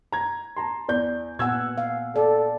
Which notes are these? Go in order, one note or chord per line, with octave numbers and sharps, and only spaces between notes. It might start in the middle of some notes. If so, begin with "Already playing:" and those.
A#5 G#6
A5 A#5 C6
E2 D5 G6
A#2 B3 F#5 G#5 E6 G#6
F5
A4 D5